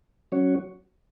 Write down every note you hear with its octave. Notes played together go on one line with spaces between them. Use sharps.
F#3 C#4 F#4 C#5